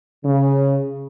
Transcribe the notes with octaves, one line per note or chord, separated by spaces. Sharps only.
C#3